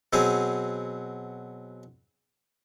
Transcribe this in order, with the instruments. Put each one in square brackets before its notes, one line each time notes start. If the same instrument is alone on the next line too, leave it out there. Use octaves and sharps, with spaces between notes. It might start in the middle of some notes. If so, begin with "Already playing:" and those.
[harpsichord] B2 F#3 C4 G#4